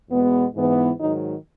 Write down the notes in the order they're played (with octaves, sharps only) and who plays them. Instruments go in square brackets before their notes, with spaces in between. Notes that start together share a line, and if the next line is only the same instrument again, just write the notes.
[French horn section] E2 B2 G#3 B3
G#2 E3 B3
G#2 D#3 F#3 D#4